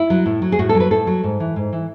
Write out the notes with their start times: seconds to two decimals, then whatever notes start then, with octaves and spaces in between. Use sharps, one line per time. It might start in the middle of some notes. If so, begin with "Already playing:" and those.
Already playing: E4
0.10 F#3
0.26 A2
0.42 F#3
0.52 G#4
0.59 A2 F#4
0.69 A4
0.75 F#3
0.80 B4
0.91 A2 A4
1.07 F#3
1.23 G#2
1.40 E3
1.56 G#2
1.73 E3